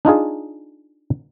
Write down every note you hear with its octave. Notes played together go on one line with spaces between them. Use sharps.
D4 D#4 F4 G#4